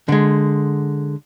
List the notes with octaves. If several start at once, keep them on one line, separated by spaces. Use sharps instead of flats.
D3 G#3